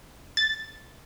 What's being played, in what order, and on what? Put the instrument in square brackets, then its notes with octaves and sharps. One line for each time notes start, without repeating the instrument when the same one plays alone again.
[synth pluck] A6